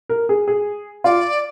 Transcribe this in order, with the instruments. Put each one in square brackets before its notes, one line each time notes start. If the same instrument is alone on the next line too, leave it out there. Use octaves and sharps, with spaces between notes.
[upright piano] A#4
G#4
G#4
[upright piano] F4 [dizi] D5